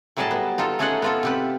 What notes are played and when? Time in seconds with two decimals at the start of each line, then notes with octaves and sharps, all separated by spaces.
0.17 A2 F#3 G3 G#4 D#5 A5
0.31 B3
0.58 D#4 F4 A4
0.79 A3 C#4 G#4 A4 D#5 F#5
1.02 B3 F4 A4
1.23 C3 G4 B4